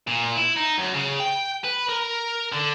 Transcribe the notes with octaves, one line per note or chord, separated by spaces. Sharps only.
A#2
E4
D#4
F#2
C#3
G5
B4
A#4
D3